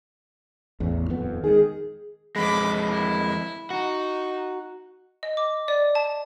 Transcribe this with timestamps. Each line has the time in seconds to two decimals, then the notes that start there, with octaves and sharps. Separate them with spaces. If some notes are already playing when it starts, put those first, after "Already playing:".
0.80 A1 E2
1.10 D#1 F2 B3
1.44 D#3 G#3 G#4
2.36 F2 G#3 B5 D6
2.88 E4
3.70 D#4 F#4
5.23 D#5
5.37 D6
5.68 D5
5.95 A5